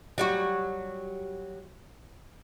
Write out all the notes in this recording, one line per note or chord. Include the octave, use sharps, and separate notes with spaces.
F#3 G3 F#4